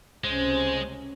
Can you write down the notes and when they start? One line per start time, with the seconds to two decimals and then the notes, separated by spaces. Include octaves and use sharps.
0.24 C#2 C3 G#3 C#4 C5